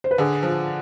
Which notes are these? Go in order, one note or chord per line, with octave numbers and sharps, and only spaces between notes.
C5
B4
D3 G#4
F3